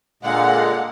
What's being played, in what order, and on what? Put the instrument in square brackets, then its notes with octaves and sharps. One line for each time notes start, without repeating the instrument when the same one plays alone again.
[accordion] A#2 D3 G#3 [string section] F5 F#5